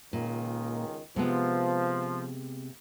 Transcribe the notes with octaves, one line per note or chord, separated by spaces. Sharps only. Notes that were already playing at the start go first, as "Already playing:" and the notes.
C#2 A#2 D#3
C3 F3 G#3 B3